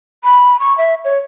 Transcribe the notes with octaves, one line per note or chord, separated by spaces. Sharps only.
B5
C#6
E5
C#5